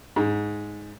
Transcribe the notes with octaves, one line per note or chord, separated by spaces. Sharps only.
G#2